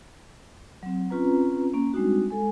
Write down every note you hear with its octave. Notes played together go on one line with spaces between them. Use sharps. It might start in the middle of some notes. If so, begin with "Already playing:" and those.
F#3 C4
C4 C#4 F4 B4 A#5
A#3 C#4
G3 G#3 C4 D4 D#4 F#4
G#3 A4 G#5